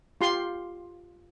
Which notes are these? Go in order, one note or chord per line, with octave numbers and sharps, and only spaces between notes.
F4 G4 C6